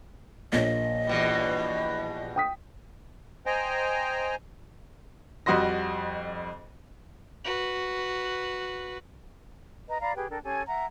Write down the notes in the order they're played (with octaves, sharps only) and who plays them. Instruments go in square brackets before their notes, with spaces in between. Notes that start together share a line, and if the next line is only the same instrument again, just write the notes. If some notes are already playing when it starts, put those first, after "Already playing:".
[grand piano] A#1 A#3 C#5 [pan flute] D#5
[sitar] E2 B2 G3
[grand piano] G5 D#6 B6
[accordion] C5 D#5 G5 G#5 A#5
[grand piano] F2 G3 F#4 D#5 C6 A#6
[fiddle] F#4 B4
[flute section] B4 D#5 A#5
D5 F5 A#5 B5
G4 G#4 B4 G5
D4 A4 A#4 G5
C#4 G4 A4 G#5
E5 F#5 A#5